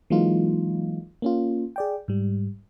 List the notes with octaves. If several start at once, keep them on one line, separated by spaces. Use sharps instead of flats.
E3 F#3 G#3 A#3 D#4 F4
A#3 C#4 F4
G#4 D5 G5
G#2 G3